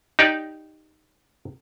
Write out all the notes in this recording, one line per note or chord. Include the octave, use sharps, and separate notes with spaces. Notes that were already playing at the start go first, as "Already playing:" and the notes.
D#4 G4 D5